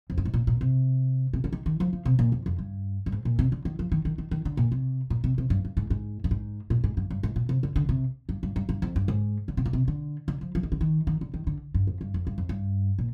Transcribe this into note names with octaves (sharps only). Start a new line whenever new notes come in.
F2
G2
G#2
A#2
A#2
C3
C3
D3
D#3
D#3
F3
F3
C3
A#2
F2
F2
G2
G2
G#2
A#2
C3
D3
D#3
F3
D#3
D#3
D#3
D#3
D3
A#2
C3
A#2
C3
C3
G2
G2
G#2
G#2
G2
G#2
A#2
G#2
G2
G2
G#2
A#2
C3
D3
D3
C3
G2
G2
G2
G2
F2
G2
G#2
D3
C3
A#2
C3
D3
D3
F3
F3
D#3
D3
D#3
D#3
D3
D#3
D3
G2
F2
G2
F2
G2
F2
G2
A#2